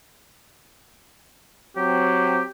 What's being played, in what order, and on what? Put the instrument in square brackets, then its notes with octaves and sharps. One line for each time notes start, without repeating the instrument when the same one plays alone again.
[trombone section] F#3 C4 [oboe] G4